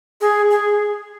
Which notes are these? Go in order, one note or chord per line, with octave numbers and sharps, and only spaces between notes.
G#4
G#4